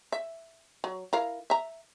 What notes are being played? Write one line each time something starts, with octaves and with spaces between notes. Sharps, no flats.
E5
F#3
E4 A#4 F5
E5 A#5